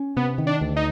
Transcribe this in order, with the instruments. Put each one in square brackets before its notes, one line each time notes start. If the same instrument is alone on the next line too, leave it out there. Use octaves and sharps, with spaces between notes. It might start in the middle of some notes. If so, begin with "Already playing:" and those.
Already playing: [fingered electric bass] C#4
[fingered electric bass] C3 [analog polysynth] B3
[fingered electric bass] D#3
[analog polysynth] D4
[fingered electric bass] D2
[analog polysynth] D#4